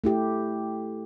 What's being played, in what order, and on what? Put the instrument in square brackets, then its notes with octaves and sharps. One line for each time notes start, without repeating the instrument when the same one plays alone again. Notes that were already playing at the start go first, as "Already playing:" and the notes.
[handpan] A3 E4 G4